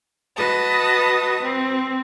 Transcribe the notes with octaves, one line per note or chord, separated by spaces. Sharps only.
F#4 B4 D#5 A5 D#6
C4